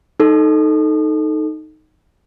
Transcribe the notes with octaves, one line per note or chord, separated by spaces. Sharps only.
D#4 A4